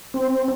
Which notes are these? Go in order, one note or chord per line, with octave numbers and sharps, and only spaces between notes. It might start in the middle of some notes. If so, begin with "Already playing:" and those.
C4